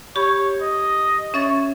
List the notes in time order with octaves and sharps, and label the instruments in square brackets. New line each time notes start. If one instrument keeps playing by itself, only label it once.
[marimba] G4 B5 [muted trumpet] C#5
[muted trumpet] D#5
[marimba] C#4 E5 A6 [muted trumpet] C#5